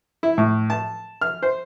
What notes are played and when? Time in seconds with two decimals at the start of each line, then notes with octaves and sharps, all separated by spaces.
0.23 E4
0.38 A2
0.70 A5
1.21 F6
1.42 C5